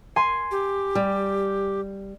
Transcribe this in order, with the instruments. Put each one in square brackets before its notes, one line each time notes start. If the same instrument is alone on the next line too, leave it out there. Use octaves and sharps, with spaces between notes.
[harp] G#5 C6
[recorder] G4
[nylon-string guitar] G3